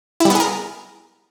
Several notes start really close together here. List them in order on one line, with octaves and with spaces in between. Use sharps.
E4 G3 B3 G#4 A#4